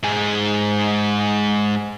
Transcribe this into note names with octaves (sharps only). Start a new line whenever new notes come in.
G#2 G#4